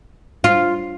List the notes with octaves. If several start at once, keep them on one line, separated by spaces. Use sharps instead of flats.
F4